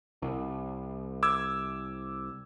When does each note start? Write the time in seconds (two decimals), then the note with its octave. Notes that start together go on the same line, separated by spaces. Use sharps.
0.22 C2
1.23 D6 E6 G#6